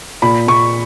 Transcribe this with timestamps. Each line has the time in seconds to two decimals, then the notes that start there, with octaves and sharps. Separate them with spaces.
0.22 A#2 B5
0.47 A#2 C#6